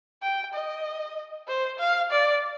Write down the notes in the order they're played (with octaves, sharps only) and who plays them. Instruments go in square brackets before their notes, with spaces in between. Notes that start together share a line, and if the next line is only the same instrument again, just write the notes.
[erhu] G5
D#5
C5
F5
D5